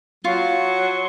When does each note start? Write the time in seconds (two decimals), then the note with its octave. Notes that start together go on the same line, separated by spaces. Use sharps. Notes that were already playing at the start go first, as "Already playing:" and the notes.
0.24 F#3 F4 C6 C#6